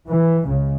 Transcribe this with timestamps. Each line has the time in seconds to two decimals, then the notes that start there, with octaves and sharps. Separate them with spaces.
0.09 E3
0.45 C#2 C#3